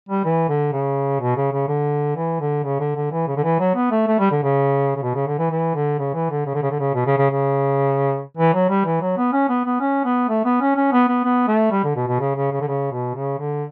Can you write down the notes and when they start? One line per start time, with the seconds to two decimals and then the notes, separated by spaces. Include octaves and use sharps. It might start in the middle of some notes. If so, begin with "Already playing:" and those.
0.09 G3
0.25 E3
0.49 D3
0.73 C#3
1.21 B2
1.36 C#3
1.52 C#3
1.68 D3
2.16 E3
2.40 D3
2.64 C#3
2.80 D3
2.95 D3
3.12 E3
3.28 C#3
3.37 D3
3.44 E3
3.59 F#3
3.75 B3
3.91 A3
4.07 A3
4.19 G3
4.31 D3
4.43 C#3
4.96 C#3
5.03 B2
5.15 C#3
5.27 D3
5.39 E3
5.50 E3
5.75 D3
5.99 C#3
6.14 E3
6.30 D3
6.46 C#3
6.54 D3
6.63 C#3
6.71 D3
6.79 C#3
6.94 B2
7.06 C#3
7.18 C#3
7.30 C#3
8.37 E3
8.53 F#3
8.69 G3
8.85 E3
9.01 F#3
9.17 B3
9.33 C#4
9.49 B3
9.65 B3
9.80 C#4
10.05 B3
10.29 A3
10.45 B3
10.61 C#4
10.76 C#4
10.92 B3
11.08 B3
11.24 B3
11.48 A3
11.71 G3
11.84 D3
11.96 B2
12.08 B2
12.20 C#3
12.36 C#3
12.52 C#3
12.61 D3
12.68 C#3
12.92 B2
13.15 C#3
13.39 D3